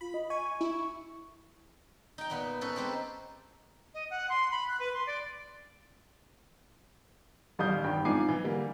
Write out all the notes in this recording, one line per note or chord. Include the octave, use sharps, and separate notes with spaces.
F4 B5
D#5
G#5 C#6
E4
D#4 G5
A#2 B3 B4 B5
C#4 D#4 A4 B4
G#3 C4 G4 A4 B4
D#5
F#5
C6
B5
F#6
B4
C6
D5
D#1 A1 G3 F5 D#6 G6
G#1 G2 G5
G#2 C4 F4 G#5 D6 C7
E3
D3 G3 A#3